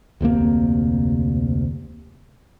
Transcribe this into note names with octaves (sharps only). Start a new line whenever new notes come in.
F1 D2 C3 A#3